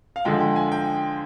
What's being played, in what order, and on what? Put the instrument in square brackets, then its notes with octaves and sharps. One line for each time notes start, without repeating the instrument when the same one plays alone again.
[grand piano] F5
[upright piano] D3 F3 G#3 [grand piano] G5
[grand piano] G5
G#5
G5